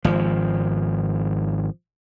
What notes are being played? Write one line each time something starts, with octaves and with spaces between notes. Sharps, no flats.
G#1 F3